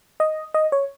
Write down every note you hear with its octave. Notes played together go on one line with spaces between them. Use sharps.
D#5
D#5
C#5